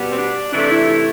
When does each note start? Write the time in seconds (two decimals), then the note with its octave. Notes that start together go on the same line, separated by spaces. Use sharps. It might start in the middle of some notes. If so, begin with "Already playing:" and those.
Already playing: B2 G3 B3
0.10 C4
0.17 D4
0.53 C3 E3 A3 D4
0.71 E4
0.88 E4